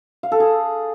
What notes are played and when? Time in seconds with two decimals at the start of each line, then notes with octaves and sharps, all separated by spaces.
0.23 F5
0.32 A4
0.40 G#4